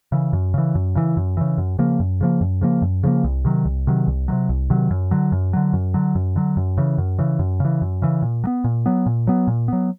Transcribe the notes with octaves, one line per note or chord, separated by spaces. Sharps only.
C#3 E3
F#2
C#3 E3
F#2
C#3 E3
F#2
C#3 E3
F#2
C#3 F3 A#3
F#2
C#3 F3 A#3
F#2
C#3 F3 A#3
F#2
C#3 F3 A#3
C2
C3 D#3 F#3
C2
C3 D#3 F#3
C2
C3 D#3 F#3
C2
C3 D#3 F#3
F#2
D3 F#3
F#2
D3 F#3
F#2
D3 F#3
F#2
D3 F#3
F#2
C#3 E3
F#2
C#3 E3
F#2
C#3 E3
F#2
C#3 E3
A#2
F#3
B3
A#2
F#3 B3
A#2
F#3 B3
A#2
F#3 B3